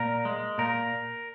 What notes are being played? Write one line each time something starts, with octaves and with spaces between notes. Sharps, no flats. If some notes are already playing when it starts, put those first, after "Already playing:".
Already playing: A#2 A#4
G#3
A#2 A#4